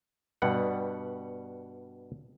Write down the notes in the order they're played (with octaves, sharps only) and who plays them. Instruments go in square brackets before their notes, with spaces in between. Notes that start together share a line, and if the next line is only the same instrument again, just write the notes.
[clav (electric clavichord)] G2 B2 G3 F#5